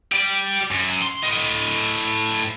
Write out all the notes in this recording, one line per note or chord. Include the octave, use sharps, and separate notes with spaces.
G4 D5
F#2
C6
A2 D#5